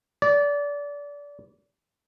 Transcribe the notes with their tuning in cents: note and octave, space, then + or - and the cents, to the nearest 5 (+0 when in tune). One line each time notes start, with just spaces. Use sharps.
D5 -25